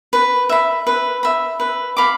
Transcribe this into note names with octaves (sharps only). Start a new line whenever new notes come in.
B4
E5 B5
B4
E5 B5
B4
F5 B5 D6